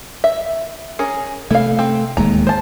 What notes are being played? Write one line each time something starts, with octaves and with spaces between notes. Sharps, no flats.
E5
C#4 G#4 A#4
C3 A3 E4 F5
C4
D1 D#2 G#3 A#5
C5 A5